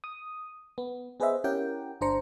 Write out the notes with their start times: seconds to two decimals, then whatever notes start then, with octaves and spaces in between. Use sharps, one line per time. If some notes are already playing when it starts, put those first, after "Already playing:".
0.04 D#6
0.78 B3
1.20 B3 G#4 B4 C5 D#5 E5
1.44 C#4 E4 G4 A#4 F#5 G5
2.01 G1 D4 C5 A#5 C#7